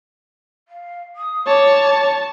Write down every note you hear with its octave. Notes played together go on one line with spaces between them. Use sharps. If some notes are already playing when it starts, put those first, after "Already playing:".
F5
D#6
C#5 A5 D6